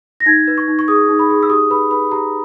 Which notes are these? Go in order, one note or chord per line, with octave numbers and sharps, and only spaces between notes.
A#6
D#4 G#6
B4
C#6
D#4
C#6
G#4 D#6
D#4
B5
G#4
E6
G4 D#6
B4 B5
B4 B5
G4 A#5